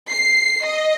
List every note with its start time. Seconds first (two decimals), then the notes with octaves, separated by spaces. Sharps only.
0.10 C7
0.64 D#5